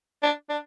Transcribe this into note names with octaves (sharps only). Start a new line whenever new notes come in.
D4
D4